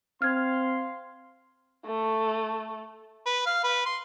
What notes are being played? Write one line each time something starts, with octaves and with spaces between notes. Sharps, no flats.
C4 F5 C6 F6 G#6
A3
B4
F5
B4
C6